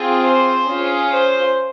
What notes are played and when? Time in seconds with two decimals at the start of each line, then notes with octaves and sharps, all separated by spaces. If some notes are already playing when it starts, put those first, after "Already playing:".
Already playing: C4 F4 G#4
0.23 C5
0.67 C#4 F4 G#4
1.12 C5